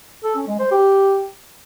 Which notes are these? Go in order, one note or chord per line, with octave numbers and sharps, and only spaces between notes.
A4
C#4
G#3
C5
G4